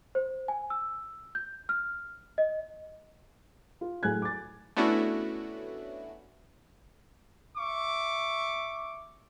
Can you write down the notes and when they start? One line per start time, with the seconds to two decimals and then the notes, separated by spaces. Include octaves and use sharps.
0.15 C5
0.48 G#5
0.70 E6
1.35 G6
1.69 F6
2.38 D#5
3.81 F4
4.03 A2 F#3 G#4 G#5 F#6 G#6
4.22 D6 A6
4.77 A3 B3 C#4 D4 E4 F#4
7.56 E5 C#6 D6